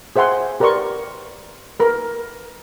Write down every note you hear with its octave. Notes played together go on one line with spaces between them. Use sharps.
G#4 C5 E5 F#5 G#5 C6
G4 A#4 B4 D5 C6 C#6
A#4 B4